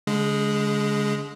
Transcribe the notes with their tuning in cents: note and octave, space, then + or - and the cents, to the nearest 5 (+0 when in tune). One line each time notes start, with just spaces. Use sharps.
D3 -45 G#3 +0